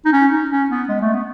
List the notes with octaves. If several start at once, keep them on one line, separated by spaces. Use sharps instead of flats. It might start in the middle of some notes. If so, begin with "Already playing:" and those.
D#4
C#4
D#4
C#4
B3
G#3
A3
B3